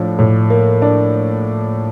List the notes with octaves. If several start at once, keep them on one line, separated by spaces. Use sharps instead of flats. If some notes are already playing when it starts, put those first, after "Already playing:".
Already playing: A2 F3 D4
A2
A#3
D4